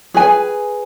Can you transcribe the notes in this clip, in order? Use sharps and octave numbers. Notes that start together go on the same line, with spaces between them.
G#4 B4 G#5